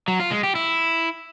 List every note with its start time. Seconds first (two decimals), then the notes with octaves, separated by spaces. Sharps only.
0.08 F#3
0.20 F4
0.32 G#3
0.43 G4
0.55 E4